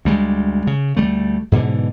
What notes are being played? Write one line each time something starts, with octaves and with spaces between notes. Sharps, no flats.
D2 G3 G#3
C#3
D2 F#3 G3 A3
G#2 B2 D3 E3